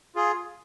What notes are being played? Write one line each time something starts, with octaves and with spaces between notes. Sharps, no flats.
F4 G#4